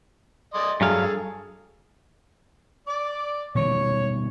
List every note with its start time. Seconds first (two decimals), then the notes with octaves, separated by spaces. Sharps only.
0.54 D5 D#5 C6
0.81 G2 F#3 G#4 A4 F5
2.87 D5
3.55 B2 D#3 G3 C#5